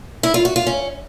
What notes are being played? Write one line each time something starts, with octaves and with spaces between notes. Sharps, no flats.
E4
F4
F#4
F4
C#4